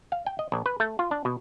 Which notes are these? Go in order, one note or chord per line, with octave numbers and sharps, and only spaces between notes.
F5
G5
D#5
A#1
B4
A3
F4
D4
B2